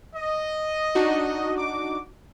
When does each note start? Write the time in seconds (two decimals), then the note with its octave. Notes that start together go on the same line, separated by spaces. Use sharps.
0.15 D#5
0.95 D4 D#4 F#4
1.58 D6